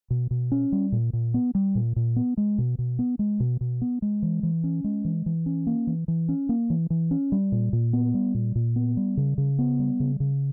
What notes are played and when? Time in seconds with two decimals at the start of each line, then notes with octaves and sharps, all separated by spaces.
0.10 B2
0.31 B2
0.52 C#4
0.72 G3
0.92 A#2
1.13 A#2
1.34 B3
1.55 G3
1.75 A#2
1.96 A#2
2.16 B3
2.37 G#3
2.58 B2
2.79 B2
2.99 B3
3.19 G#3
3.40 B2
3.61 B2
3.81 B3
4.02 G#3
4.22 E3
4.43 E3
4.64 C#4
4.84 G#3
5.05 E3
5.26 E3
5.46 C#4
5.67 A#3
5.87 E3
6.08 E3
6.29 C#4
6.49 A#3
6.70 E3
6.90 E3
7.11 C#4
7.32 G3
7.52 A#2
7.73 A#2
7.93 B3
8.14 G3
8.35 A#2
8.55 A#2
8.76 B3
8.97 G3
9.17 C#3
9.38 C#3
9.59 B3
9.79 G3
10.00 C#3
10.20 C#3